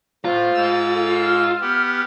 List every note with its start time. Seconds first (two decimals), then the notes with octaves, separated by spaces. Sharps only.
0.25 A2 F4 C5
0.55 G#2 E6
0.93 A4
1.24 F6
1.61 B3 G4